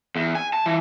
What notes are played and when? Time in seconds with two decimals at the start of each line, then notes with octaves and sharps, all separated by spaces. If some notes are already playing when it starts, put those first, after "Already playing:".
0.16 E2
0.35 G#5
0.53 A5
0.66 E3